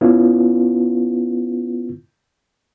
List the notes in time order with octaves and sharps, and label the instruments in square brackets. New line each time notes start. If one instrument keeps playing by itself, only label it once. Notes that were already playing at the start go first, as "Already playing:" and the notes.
[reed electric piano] B3 C#4 E4 F4 B4